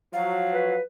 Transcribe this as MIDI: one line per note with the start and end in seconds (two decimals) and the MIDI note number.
0.13 0.77 53
0.13 0.77 54
0.13 0.75 77
0.52 0.82 71